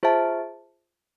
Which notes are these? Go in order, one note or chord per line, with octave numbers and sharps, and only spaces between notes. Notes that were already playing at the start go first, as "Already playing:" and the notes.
F4 G#4 C5 E5 A5